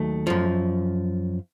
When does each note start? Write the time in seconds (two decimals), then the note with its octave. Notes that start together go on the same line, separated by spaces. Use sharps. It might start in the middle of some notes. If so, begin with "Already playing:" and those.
Already playing: D#2 D#3 F#3 A3
0.27 F#2 F3